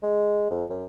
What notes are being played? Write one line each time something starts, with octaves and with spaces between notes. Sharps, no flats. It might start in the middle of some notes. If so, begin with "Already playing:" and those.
G#3
F2
F#2